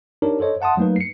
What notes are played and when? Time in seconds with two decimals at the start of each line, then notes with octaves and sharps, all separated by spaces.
0.22 D4 D#4 G4 A#4 C#5
0.40 A4 C5 C#5 D#5
0.61 E5 F#5 A5 C6 D#6
0.77 F#3 A3 A#3 D#4 B4
0.96 C7 C#7